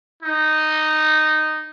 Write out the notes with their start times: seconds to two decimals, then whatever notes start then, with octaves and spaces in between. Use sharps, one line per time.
0.23 D#4